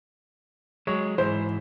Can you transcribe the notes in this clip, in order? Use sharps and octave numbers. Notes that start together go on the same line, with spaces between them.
F#3 G#3 C#5
G#2 E3 C5